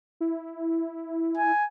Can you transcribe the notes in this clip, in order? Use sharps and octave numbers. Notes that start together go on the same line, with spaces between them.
E4
G#5